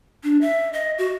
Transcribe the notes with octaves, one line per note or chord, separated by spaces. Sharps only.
D4
E5
D#5
F#4